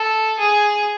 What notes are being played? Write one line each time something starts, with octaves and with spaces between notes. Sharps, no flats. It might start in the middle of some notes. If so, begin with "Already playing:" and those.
Already playing: A4
G#4